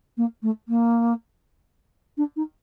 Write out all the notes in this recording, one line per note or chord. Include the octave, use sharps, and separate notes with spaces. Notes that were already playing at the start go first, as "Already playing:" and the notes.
A#3
A3
A#3
D4
D#4